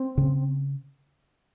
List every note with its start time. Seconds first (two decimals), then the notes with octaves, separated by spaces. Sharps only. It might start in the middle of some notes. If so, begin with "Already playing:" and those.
Already playing: C4
0.18 C#3